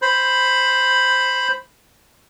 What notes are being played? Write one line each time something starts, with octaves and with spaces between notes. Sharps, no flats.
C5 B5